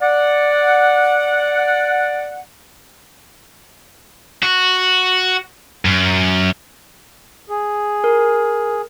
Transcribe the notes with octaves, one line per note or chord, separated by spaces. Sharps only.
D5 F#5
F#4
F#2
G#4
A#4